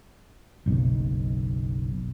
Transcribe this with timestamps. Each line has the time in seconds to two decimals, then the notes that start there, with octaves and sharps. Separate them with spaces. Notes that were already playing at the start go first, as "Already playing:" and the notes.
0.66 F#1 B1